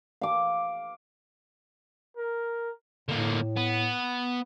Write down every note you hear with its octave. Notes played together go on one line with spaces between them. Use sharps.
F5 D6
A#4
A2 D3 A#3
B3